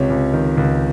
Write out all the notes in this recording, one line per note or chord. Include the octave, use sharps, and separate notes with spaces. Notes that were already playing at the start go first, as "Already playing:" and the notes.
Already playing: C#2 C3 C#5
C#2
D#3
C#2